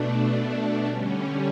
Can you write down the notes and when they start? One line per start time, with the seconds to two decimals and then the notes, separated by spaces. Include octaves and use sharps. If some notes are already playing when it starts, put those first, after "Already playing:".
Already playing: B2 A3 D4
0.86 D3 G3 C#4